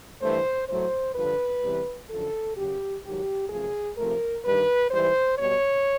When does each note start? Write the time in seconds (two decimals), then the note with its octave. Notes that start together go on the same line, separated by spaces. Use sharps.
0.21 G2 E3 A3 C5
0.68 A2 F#3 A3 C5
1.15 G2 D3 F3 B4
1.62 E2 C3 E3 G3
2.09 F#2 D3 F3 A4
2.56 F#2 C#3 F#3 G4
3.04 G#2 D#3 F#3 G4
3.50 F#2 C#3 F3 A3 G#4
3.97 C3 F3 A3 A#4
4.44 G2 D#3 G3 B4
4.91 G#2 E3 G3 C5
5.38 B2 G3 C#5